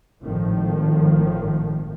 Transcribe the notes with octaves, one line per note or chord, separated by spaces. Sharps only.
G#1 A2 D#3 F3